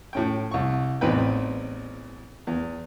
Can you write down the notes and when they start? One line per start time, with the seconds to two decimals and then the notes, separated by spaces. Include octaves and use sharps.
0.13 A2 C#4 G5
0.51 C2 C#6
1.01 A1 E2 C4 D#4 B4 G5
2.47 E2